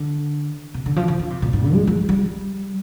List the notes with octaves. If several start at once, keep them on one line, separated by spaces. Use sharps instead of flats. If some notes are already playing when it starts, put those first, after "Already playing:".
Already playing: D3
C3
D3
F3
D3
D#3
C3
A#2
G#2
D3
G#3
F3
G3